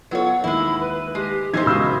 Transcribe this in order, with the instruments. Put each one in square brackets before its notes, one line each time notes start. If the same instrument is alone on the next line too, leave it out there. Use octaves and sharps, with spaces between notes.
[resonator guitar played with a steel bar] F#3 C#5 [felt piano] B3 F4 A4 [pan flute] F#5
[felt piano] D#2 [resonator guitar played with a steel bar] G#3 E4 [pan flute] B5
[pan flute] B4
[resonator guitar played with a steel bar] G#3 [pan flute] G4
[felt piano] G1 D#4 G4 [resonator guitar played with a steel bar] E3 A#4 C5 [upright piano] G#6
[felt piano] C#2 G#3 D#6 [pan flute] F#4 [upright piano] B5 E6